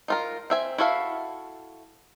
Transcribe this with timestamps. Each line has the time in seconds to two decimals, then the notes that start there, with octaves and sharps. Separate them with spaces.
0.08 D#4 F4 A#4
0.50 C4 E5 G#5
0.78 E4 F#4 A4 E5 F5